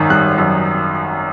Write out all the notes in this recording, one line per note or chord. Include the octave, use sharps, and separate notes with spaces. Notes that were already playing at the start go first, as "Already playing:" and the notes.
Already playing: G#1 F#2 D#3 D#6
G3 F#6
F#2